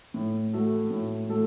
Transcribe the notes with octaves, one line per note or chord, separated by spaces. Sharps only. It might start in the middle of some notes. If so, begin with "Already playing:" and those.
A2
A3 F#4 A4
A2
A3 F#4 A4